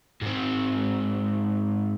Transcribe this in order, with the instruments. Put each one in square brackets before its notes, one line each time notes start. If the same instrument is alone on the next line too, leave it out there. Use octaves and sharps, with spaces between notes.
[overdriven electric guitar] G#2 C4